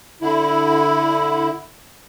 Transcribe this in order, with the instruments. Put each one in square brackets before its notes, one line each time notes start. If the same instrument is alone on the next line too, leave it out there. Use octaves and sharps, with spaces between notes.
[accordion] D3 E4